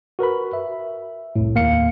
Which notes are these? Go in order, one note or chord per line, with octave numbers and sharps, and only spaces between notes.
F#4 A#4 B4 B5
E5
C2 F2 A2
D#2 A#3 F5 C#7